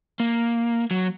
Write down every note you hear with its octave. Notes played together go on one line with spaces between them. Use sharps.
A#3
F#3